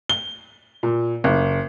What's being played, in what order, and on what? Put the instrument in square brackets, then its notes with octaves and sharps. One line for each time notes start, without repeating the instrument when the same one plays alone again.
[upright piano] G7
A#2
F#1